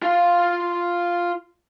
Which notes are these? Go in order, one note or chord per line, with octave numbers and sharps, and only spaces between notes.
F4 F5